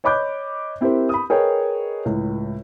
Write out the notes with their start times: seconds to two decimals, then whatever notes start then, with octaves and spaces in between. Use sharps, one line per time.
0.04 C#5 D#5 B5 D6 F#6 G6
0.81 C4 E4 G4 A#4 C5
1.09 B5 D#6
1.30 G#4 A#4 B4 C#5 D#5 G5
2.05 C#2 A2